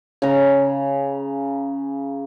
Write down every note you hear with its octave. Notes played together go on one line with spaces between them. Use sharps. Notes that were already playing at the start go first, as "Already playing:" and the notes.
C#3 A#5